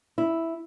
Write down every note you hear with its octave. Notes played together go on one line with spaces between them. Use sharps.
E4